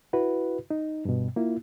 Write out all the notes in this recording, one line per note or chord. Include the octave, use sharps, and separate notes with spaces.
E4 F#4 B4
D#4
G2 B2
A#3 E4 F4